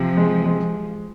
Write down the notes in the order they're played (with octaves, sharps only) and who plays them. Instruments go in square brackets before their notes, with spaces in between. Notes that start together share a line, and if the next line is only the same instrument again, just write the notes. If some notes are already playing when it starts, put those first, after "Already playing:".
Already playing: [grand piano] C3 [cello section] F3
[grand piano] G#3
G#3